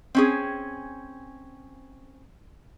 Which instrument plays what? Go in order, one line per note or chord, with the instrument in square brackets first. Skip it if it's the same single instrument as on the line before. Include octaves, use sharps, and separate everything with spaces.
[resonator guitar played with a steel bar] C4 C#4 G#4